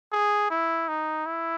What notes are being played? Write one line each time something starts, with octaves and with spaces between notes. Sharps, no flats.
G#4
E4
D#4
E4